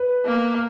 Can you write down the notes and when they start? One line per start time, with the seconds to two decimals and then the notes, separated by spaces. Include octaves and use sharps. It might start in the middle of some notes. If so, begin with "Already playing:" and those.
Already playing: B4
0.25 A#3